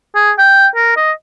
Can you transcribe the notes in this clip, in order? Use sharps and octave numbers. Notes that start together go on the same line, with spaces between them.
G#4
G5
A#4
D#5